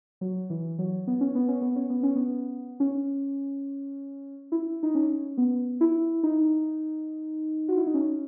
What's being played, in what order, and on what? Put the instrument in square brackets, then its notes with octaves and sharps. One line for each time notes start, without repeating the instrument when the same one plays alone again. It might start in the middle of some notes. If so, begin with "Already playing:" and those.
[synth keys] F#3
E3
F#3
B3
C#4
B3
C#4
B3
C#4
B3
C#4
B3
C#4
E4
D#4
C#4
B3
E4
D#4
F#4
E4
D#4
C#4